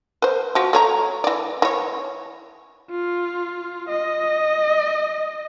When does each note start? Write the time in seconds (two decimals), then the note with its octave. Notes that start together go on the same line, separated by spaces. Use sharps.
0.22 B4 C5
0.55 F3 F#4
0.73 A3 C#5 A#5
1.24 E3 D5
1.62 E3 C#5
2.90 F4
3.89 D#5